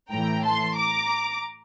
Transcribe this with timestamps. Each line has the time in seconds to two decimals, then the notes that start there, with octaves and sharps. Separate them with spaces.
0.10 A2 E3 A3 G5 A#5
0.43 A5 C6
0.76 A#5 D6